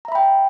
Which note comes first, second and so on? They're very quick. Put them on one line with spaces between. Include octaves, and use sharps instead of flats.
A#5 E5 B5 G5